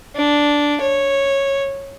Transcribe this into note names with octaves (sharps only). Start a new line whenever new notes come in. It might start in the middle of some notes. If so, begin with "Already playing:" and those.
D4
C#5